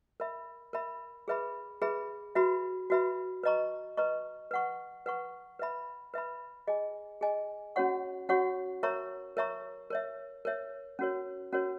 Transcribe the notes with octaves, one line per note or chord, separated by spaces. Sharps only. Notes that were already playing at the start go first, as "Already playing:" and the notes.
A#4 E5 B5
A#4 E5 B5
G#4 B4 E5 B5
G#4 B4 E5 B5
F#4 B4 E5 B5
F#4 B4 E5 B5
B4 D#5 A#5 C#6
B4 D#5 A#5 C#6
B4 F#5 C#6
B4 F#5 C#6
B4 E5 B5
B4 E5 B5
G#4 D#5 G#5
G#4 D#5 G#5
C#4 F#4 C#5 F#5 C#6
C#4 F#4 C#5 F#5 C#6
A#4 C#5 E5 A#5 C#6
A#4 C#5 E5 A#5 C#6
A#4 C#5 E5
A#4 C#5 E5
C#4 F#4 A#4 C#5
C#4 F#4 A#4 C#5